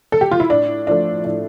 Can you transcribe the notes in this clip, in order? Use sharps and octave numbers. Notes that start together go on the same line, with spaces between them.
A4
G4
F4
E4
A2 D4
F3 A3 D4
A2 D4